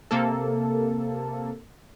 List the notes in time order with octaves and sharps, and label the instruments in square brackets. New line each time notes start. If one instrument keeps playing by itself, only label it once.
[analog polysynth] C3 A#3 A4